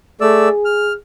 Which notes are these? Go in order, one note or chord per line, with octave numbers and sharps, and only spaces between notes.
A3 G#4 D5 E6
F6